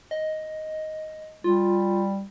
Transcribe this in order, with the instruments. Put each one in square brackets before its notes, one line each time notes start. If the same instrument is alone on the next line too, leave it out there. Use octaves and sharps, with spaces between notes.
[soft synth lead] D#5
[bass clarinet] G3 [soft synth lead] F4